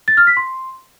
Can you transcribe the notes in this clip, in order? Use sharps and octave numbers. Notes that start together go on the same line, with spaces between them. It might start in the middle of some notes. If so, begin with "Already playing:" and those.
A6
F6
B6
C6